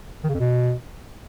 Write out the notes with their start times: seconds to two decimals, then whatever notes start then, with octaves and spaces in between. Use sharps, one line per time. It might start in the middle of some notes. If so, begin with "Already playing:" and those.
0.24 D#3
0.29 C#3
0.34 F2
0.39 B2